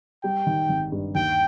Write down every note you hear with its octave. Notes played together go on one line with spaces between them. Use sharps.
G3 G5
D#3
G#1
G2
D#2 G5